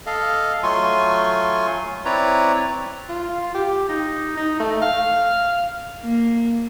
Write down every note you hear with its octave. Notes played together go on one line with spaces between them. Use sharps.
A4 D#5 F5
F#3 A3 F4 G#5 C6 C#6
C4 E4 B4 C#5 D5 A#5
F4
G4
D#4
D#4
A3
F5
A#3